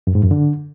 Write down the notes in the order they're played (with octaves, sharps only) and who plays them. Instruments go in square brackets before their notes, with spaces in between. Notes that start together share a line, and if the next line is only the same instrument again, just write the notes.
[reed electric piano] F#2
G#2
F#2
D3